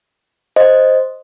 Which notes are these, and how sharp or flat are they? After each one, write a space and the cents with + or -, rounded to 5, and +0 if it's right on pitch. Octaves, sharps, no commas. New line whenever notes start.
C5 +0 D#5 +0